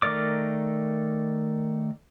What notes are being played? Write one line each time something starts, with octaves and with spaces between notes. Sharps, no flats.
D#3 A3 A#4 D5 D6